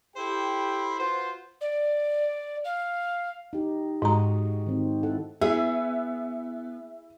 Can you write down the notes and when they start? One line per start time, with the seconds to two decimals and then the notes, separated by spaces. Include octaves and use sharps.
0.17 E4 G4 A4 C5 G5 B5
0.99 F4 F#4 B4 C5
1.61 D5
2.64 F5
3.53 D#4 G4
4.02 G#2 G#3 F#4 D#5 A#5
4.67 D#3 C4
5.03 E4 A4 F#5
5.41 B3 E4 G#4 E5